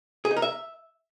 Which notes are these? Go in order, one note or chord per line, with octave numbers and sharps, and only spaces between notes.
G#4
D#4
A#4
E5